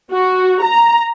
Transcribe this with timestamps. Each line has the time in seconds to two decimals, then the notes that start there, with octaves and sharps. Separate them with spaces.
0.12 F#4
0.62 A#5